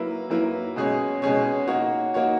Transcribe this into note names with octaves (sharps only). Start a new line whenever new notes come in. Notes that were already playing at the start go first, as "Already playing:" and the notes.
Already playing: F#3 A#3 E4 B4
F#3 A#3 E4 B4
B2 G#3 C#4 G#4 C#5
B2 G#3 C#4 G#4 C#5
A#3 D#4 F#4 C#5
A#3 D#4 F#4 C#5